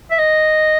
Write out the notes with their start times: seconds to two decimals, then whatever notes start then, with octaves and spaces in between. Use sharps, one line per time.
0.11 E5
0.18 D#5